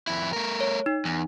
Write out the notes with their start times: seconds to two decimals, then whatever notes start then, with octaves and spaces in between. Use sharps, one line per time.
0.07 F2 E4
0.33 A3 A#4
0.60 C#5
0.86 D#4
1.05 E2